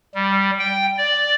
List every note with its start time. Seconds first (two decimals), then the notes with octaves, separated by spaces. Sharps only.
0.15 G3
0.59 G5
0.98 D5